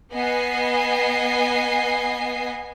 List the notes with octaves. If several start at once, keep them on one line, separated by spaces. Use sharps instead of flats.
B3 D#5 G#5 C7